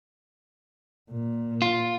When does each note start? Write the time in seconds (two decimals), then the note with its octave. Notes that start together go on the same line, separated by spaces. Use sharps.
1.11 A#2
1.62 F4